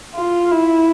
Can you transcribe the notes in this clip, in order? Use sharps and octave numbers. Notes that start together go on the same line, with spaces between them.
F4
E4